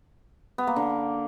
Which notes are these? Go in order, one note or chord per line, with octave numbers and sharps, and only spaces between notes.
B3
A#3
D3